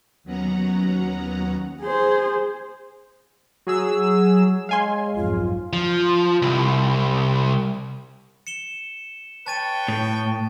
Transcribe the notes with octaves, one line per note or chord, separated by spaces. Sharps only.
D#2 F#3 B3 C#4 F#5 A#5
G#4 C5
F#3 G#4 E6
G#3 C#5 F5 G#5 C6
B1 F2 G#2 F4
F3
C2
C#7 E7 G7
B4 C#5 G5 A5 A6 D#7
A2